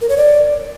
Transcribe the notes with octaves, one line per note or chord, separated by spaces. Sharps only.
A#4
C#5
D5